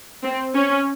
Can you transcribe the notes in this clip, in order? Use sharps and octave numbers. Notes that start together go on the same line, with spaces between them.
C4
C#4